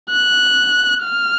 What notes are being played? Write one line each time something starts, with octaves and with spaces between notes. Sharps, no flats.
F#6
F6